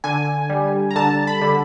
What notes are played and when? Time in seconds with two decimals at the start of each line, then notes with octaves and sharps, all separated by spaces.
0.04 D3 G#5
0.50 G3
0.91 A#5
0.96 D3 A5
1.27 B5
1.42 D3